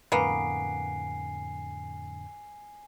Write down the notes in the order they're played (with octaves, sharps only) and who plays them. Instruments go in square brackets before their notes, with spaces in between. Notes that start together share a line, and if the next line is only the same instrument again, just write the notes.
[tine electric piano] F2 A2 D3 [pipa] A#3 B3 [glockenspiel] G#5 C7